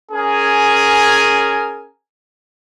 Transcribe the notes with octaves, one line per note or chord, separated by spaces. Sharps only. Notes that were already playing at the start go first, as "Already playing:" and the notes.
C#4 G#4 A#4 G#5